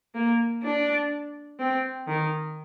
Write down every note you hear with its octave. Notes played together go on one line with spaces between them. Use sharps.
A#3
D4
C4
D#3